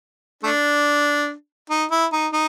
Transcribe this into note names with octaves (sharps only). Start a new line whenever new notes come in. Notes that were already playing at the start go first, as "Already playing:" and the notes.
A3 D4
D#4
E4
D#4
D#4